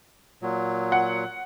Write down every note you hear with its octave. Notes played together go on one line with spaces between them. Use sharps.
A#2 F#3
F#5